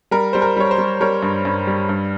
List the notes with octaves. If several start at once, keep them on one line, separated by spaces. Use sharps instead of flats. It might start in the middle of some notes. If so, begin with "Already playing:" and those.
G3 A#4
G3 C5
A#4
G3 C#5
C5
G3
G3 A#4 C#5
G2
G2
G3
G2